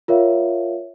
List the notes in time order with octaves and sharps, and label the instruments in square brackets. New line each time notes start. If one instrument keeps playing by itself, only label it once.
[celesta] F4 A#4 C#5 E5 F5